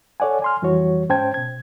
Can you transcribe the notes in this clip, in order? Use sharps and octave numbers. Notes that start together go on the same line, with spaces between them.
A4 C#5 D5 F#5 G#5
G#5 C6 F6
F2 E3 G3 F#4 C#5
G#2 C#4 C5 G5 A5 G#6
B2 G#6